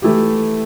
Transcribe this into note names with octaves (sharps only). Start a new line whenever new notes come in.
E3 A3 E4 G4